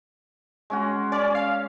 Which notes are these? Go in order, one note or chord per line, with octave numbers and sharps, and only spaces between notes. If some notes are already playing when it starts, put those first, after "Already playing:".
G#3 C#4 F#4
C#4 D5
F5